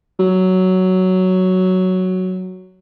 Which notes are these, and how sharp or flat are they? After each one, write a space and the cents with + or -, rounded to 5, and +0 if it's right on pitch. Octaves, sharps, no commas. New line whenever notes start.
F#3 +5